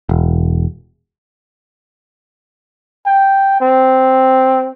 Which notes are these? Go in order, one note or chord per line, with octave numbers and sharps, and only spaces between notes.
E1
G5
C4